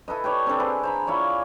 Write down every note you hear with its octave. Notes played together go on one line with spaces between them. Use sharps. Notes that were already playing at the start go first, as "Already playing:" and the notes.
E4 A4 B4 D#5
G4 B4 C#5 D5
C4 D4 A4 C5
E4 G#4 B4
C5 A#5 B5
E4 F4 C#5 D5